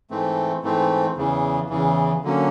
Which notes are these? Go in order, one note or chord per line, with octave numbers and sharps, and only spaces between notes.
G#2 E3 A3 C4
G#2 E3 A3 C4
E2 C#3 E3
E2 C#3 E3
D3 F#3 A#3 C#4